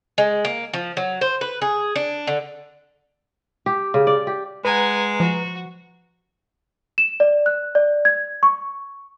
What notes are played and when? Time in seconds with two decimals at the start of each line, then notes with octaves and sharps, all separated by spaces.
0.18 G#3
0.45 A#3
0.73 F3
0.97 F#3
1.21 C5
1.41 B4
1.62 G#4
1.96 D4
2.27 D3
3.66 G4
3.94 C#3
4.07 D5
4.27 G4
4.65 G#3 B4 F#5 G#5 A#5
5.20 F3 F#4
6.98 E7
7.20 D5
7.46 F#6
7.75 D5
8.05 G#6
8.43 C#6